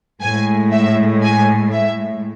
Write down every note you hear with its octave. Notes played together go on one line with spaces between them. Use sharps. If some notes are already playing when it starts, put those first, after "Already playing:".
A2 G#3 G#5
E5
G#5
E5